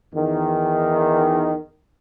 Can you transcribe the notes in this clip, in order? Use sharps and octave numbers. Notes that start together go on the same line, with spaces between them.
E2 D#3